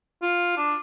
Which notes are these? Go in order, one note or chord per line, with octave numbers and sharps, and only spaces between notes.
F4
D4